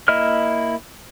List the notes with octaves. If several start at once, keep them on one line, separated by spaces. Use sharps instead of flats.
A#3 E4 D#5 E5 F6